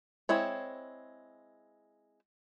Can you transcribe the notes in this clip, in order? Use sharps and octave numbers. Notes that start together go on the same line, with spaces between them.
G#3 C4 E4 C#5